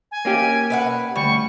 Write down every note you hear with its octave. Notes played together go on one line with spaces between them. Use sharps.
G#5
A#3 C#4 G4
B4 E5 F#5
D2 G3 C#6